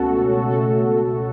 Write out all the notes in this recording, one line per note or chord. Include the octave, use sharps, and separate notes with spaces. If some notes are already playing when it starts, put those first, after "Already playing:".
Already playing: C#2 B2 A3 C#4 F#4 A4
C#2 B2 A3 C#4 F#4 A4